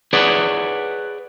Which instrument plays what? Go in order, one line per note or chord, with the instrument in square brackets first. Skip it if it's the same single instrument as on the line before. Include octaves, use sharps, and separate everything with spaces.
[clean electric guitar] G#4 B4 C#5 D5 F#5